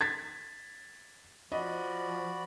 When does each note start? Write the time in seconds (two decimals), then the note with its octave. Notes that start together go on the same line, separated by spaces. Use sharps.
0.01 G#6 A6 B6
1.52 F3 F#4 D5 D#5 B5